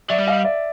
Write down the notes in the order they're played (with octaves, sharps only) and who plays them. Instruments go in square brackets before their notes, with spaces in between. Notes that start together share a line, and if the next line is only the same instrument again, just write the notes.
[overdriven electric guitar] F#3 [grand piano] D5 E5
[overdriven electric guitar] G3
[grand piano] D#5 F5
D5 E5